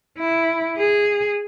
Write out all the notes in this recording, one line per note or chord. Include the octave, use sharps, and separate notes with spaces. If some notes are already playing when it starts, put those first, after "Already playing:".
E4
G#4